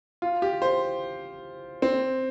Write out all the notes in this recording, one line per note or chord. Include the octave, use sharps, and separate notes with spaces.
F4
G4
C5
C4